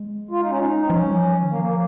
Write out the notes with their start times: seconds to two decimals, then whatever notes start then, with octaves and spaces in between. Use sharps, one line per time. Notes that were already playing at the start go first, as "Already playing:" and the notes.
Already playing: G#3
0.31 F4
0.41 D#4
0.50 C#4
0.60 D#4
0.84 C4
0.90 F3 C#4
1.02 G3
1.13 F3
1.42 D#3
1.50 F3 A#3
1.65 A#3